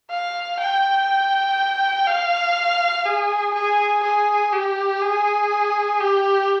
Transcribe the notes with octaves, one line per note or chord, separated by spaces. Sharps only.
F5
G5
F5
G#4
G#4
G#4
G4
G#4
G4